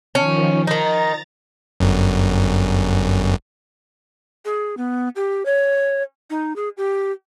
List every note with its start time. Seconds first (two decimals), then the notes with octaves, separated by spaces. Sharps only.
0.15 D#3 F3 C#4
0.67 D#3 D#4 A#5 A6
1.80 G1 F#2
4.45 G#4
4.77 B3
5.16 G4
5.46 C#5
6.30 D#4
6.56 G#4
6.77 G4